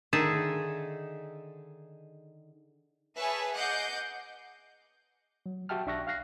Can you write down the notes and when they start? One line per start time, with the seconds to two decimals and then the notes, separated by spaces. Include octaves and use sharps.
0.13 D3 D#3 D#4 G#4 E5 A5
3.18 G#4 B4 C#5 E5 G#5 A5
3.56 D#5 F#5 D6 G6 C7
5.46 F#3
5.69 F#4 G4 E5 G5 A5 F6
5.86 B1 D4 E5 C#6 F#6 A#6
6.07 F5 F6 F#6 A#6 C7